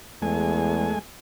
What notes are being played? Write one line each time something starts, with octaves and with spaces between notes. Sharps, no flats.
E2 G#3 A3 G#5